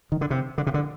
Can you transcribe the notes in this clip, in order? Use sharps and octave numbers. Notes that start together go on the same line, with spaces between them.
D#3
D3
C3
D3
C3
D3